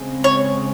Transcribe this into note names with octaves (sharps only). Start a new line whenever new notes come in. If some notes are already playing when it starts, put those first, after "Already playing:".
Already playing: C#3 G#3 C4
C#5